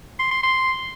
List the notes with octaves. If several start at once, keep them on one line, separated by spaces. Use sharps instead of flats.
C6
C6
C6